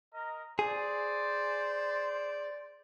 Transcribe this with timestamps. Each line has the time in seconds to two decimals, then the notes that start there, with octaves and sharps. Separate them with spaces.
0.14 A#4 D#5
0.59 G#4 C5 D5